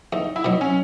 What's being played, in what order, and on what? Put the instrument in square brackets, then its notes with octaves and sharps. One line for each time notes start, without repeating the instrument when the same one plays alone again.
[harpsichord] E2 [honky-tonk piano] D#4
[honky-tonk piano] E4
[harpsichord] B2 F#3 [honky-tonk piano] D#4
[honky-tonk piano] C#4